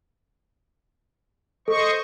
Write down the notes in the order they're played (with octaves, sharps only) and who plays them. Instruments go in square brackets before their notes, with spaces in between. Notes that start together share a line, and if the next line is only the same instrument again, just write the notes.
[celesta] A4 [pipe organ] C5 D#5 C#6